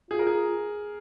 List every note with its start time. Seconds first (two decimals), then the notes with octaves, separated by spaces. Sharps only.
0.11 F4 G#4
0.19 A#4
0.27 G#4